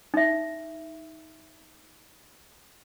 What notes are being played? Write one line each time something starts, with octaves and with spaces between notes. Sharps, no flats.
D#4 E5